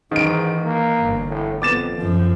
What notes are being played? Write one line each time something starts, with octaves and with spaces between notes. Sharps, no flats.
G#2 D#3 E3 D7
A#3
G1
A2
F2 B3 D6 A6 E7
F#2 F3